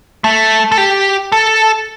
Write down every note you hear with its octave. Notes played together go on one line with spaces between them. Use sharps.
A3
A4
G4
A4